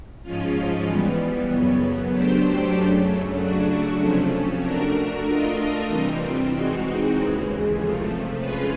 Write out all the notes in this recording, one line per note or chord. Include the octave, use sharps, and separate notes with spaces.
G#2 F3 G#3 C#4 F4
E3 G3 B3
F#2 C#3 F#3 B3
F#3 A3 D4 G4 C5
F#2 C#3 F#3 A3
C#3 F#3 A3 D4 F#4
C3 F3 A3 C#4
A3 D4 F#4 A#4
A3 D4 F4 A#4 D#5
C3 E3 G3 C4
E3 G#3 C4 D#4 F#4
D#2 C#3 E3 G#3
C3 F3 A3
G#3 C#4 F4 G#4 B4